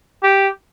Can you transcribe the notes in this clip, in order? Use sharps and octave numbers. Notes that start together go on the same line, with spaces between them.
G4